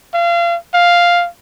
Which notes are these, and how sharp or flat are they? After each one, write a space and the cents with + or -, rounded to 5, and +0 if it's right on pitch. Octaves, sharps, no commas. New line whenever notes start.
F5 -30
F5 +0